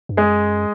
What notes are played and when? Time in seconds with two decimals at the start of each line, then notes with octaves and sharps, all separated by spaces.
0.09 G2
0.17 F#2 G#3 G#4